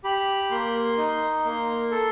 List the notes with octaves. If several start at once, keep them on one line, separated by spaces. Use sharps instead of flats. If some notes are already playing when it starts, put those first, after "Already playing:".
G4 B5
A#3 C6
D#4
A#3
A4